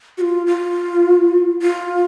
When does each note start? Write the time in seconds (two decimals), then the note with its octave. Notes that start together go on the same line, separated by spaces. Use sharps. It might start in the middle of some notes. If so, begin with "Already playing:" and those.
0.18 F#4
0.21 F4
0.47 F4
1.62 F4